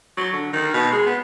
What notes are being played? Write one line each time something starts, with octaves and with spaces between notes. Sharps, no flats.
F#3
D3
D#3
B2
G#3
B3